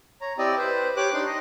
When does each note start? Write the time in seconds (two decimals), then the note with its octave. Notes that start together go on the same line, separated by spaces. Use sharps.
0.21 C#5 A#5
0.38 C4 E4 G4 D5 D#5
0.58 B4 C5
0.97 G4 C#5 D6 F#6
1.13 D4 D#4 C6
1.27 D#5